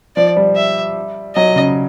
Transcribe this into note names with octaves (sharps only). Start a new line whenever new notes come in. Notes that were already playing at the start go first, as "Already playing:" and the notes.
F3 D5
G3
E5
F#3 D#5
C#3